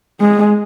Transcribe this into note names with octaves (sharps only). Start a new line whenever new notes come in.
G#3